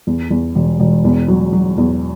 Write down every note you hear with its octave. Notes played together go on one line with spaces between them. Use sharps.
E2
E2
E1
E1
E2
F#3
F#3
E2